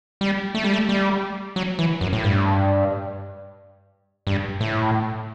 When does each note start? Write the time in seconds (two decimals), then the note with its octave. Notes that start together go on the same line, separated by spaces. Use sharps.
0.21 G3
0.55 A3
0.64 G3
0.73 A3
0.89 G3
1.56 F#3
1.79 E3
2.01 F#2
2.13 A2
2.24 G2
4.27 G2
4.61 A2